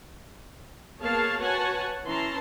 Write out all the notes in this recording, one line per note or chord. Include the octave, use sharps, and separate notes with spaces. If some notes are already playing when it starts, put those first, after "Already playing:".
A#3 B3 G#4 C#5 F5 A5
F#4 B4 C#5 F#5 G#5 A5
E3 C#4 E4 A5 A#5 C6